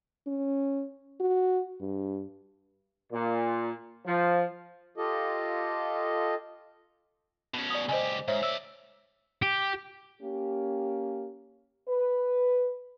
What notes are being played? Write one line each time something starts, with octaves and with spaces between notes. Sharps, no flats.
C#4
F#4
G2
A#2
F3
F4 G4 A4 D#5
B2 C#4
D5 D#6
C#2 G4 C5 D#5 G#5
G#2 C5 C#5 E5
D5 E5 E6
G4
A#3 C#4 G4
B4